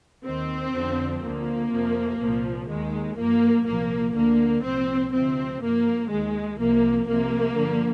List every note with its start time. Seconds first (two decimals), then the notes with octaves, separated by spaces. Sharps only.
0.25 D#2 D#3 C4
0.73 F2 D3 F3
1.22 D2 D3 F3 A#3
1.72 F2 C3 F3
2.20 C2 A#2 F3
2.68 D#2 D#3 G#3
3.17 G2 F3 A#3
3.66 C2 A#2 F3 A#3
4.14 D2 D3 F3 A#3
4.63 C2 A#2 F3 C4
5.12 D2 C3 F3 C4
5.61 G2 F3 A#3
6.09 D#2 D#3 G#3
6.59 C2 C3 F3 A#3
7.07 C2 C3 F3 A#3
7.56 G2 D3 F3